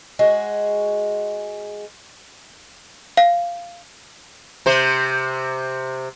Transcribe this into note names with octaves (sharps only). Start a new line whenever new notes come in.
G#3 F#4
F5
C3 C5